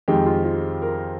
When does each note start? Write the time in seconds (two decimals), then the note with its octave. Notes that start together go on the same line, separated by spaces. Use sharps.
0.08 F2 D#3 G#3 G4
0.26 F4
0.45 F4
0.82 A#4